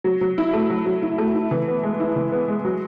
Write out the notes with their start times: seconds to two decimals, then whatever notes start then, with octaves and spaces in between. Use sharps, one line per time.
0.04 F#3
0.21 F#3
0.38 E4
0.53 A3
0.70 F#3
0.86 F#3
1.02 E4
1.18 A3
1.35 E4
1.51 E3
1.67 B3
1.83 G#3
2.00 E4
2.16 E3
2.32 B3
2.48 G#3
2.65 F#3